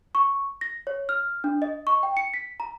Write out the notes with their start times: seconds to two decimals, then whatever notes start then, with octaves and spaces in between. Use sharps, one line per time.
0.15 C#6
0.61 A#6
0.87 C#5
1.09 F6
1.44 D4
1.62 D#5
1.87 C#6
2.03 G5
2.17 C#7
2.34 B6
2.60 A#5